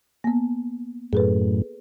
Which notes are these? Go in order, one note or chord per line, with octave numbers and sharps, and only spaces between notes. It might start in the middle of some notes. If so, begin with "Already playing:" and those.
A#3 B3
F#2 A2 G#4 A4 B4